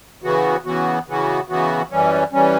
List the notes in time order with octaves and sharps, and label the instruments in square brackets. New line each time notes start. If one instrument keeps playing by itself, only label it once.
[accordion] C#3 E3 B3 F#4
C#3 E3 B3 F#4
C#3 E3 B3 F#4
C#3 E3 B3 F#4
F#2 E3 G3 C#4
E3 G3 C#4